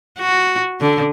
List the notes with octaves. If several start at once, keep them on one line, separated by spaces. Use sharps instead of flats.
F#4
D3